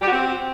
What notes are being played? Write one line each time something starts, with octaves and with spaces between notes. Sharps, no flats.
G4
F#4
C4